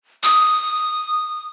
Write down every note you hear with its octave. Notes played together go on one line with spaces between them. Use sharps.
D#6